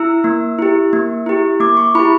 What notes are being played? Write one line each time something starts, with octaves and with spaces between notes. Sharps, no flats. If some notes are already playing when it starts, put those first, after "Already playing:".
Already playing: E4 E6
A#3
E4 G4
A#3
E4 G4
A#3 D6
C#6
E4 G4 B5